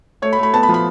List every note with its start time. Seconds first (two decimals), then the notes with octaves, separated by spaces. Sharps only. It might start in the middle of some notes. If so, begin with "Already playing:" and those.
0.22 A3 C#5
0.33 B5
0.38 A3
0.43 B5
0.53 B3 A5
0.63 B5
0.69 F3
0.74 B5